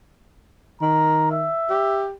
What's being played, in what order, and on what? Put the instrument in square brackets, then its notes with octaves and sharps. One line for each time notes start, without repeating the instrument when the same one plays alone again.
[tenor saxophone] D#3 [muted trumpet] A#5
[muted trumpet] E5
[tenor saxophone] G4